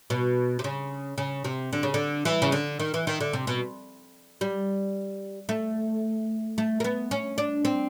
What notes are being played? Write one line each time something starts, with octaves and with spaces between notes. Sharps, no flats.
B2
C3
C#3
C#3
C3
D3
C#3
D3
E3
C#3
D3
D#3
E3
D#3
D3
C3
B2
G3
A3
A3
A#3
B3
C#4
D4
C4